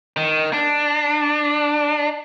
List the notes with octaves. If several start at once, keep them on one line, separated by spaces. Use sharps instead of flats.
D#3
D4